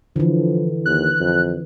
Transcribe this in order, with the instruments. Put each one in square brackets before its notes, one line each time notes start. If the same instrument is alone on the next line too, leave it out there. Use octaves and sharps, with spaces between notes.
[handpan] D3 E3 [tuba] F3
[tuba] D#2 [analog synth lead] F#6
[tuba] F2